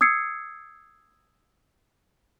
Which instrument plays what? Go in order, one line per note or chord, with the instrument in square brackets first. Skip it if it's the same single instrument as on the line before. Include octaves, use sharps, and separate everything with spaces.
[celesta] D#6 E6 G#6 C7 C#7